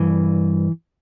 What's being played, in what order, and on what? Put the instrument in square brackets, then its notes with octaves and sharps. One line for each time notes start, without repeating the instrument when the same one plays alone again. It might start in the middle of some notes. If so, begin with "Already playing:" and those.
Already playing: [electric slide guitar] G2 E3